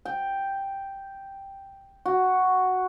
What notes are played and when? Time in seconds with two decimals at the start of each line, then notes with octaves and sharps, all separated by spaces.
0.05 G5
2.06 F#4